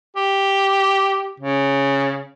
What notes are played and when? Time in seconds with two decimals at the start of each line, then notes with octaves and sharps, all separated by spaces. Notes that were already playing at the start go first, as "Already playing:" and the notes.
0.16 G4
1.40 C#3